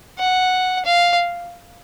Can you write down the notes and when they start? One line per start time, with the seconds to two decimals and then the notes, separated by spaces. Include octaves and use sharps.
0.19 F#5
0.85 F5